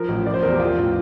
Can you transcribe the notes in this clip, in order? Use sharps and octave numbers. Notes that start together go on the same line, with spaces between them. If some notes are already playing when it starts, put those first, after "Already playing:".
Already playing: F3 A#4
A1
F3 D5
C5
E2 A#4
G4
F3 F4
A1